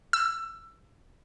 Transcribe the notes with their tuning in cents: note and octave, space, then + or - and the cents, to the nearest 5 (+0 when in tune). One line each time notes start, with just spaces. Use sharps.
E6 +20